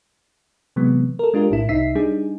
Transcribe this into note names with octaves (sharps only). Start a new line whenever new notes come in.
C3 E3 F#3 G#3 B3
A4 A#4
G#3 D4 F4 G4 A#4
B1 A2 E4
C2 D#4 E5 B6 C7
G3 D4 D#4 G#4